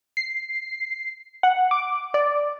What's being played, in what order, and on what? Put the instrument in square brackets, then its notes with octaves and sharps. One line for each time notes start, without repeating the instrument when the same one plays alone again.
[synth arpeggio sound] C7
F#5
D6
D5